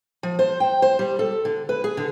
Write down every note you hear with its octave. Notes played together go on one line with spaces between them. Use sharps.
F3
C5
G5
C5
G3
A4
D3
B4
G#4
D3